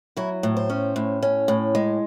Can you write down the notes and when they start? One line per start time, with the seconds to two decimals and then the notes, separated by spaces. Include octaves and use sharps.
0.17 F#3 E4
0.43 A2
0.57 C5
0.70 C#4
0.96 A2
1.23 C#4
1.48 A2
1.75 G#3